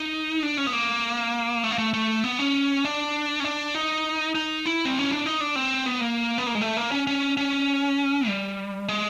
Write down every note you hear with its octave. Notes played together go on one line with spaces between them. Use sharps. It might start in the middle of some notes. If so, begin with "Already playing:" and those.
Already playing: D#4
D4
C#4
B3
A#3
A3
A#3
A3
A3
B3
C#4
D4
C#4
D4
D#4
D#4
E4
C4
C#4
D4
D#4
D4
C4
B3
A#3
B3
A#3
G#3
A3
A#3
C#4
C#4
C#4
G3
G#3